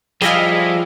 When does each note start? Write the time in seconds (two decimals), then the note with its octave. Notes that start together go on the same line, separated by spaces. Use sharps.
0.22 F3 G3 E4 G#4 D#5 F5